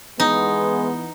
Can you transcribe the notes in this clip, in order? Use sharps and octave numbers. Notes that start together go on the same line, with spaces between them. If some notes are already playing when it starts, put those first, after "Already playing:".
E3 G#3 B3 D#4